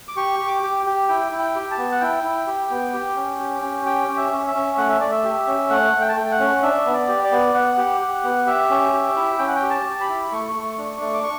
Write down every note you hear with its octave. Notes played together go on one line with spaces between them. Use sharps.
D6
G4 C#6
G4
D6
G4
G4
E4 G5
E4
G5
G4
A5
B3
F#5
E4 G5
E4
G4
B3
G4
C#4
G4
C#4
G4 G5
C#4
E5
C#4
E5
C#4
A3 F#5
E5
A3 D5
E5
G4
C#4
A3 F#5
A3
G5
A5
A3 G5
F#5
C#4
D4 E5
B3
D5
G4
D5
B3
B3 F#5
G4
G4
B3
G4 E5
C#4
G4
E4
C#4 G5
F#5
G5
G4
A5
G4
B5
E4
A3 C#6
A3
D4
A3
D6
C#6